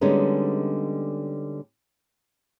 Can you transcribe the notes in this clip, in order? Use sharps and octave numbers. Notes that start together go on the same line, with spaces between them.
D3 G3 G#3 B3 C#4 D#4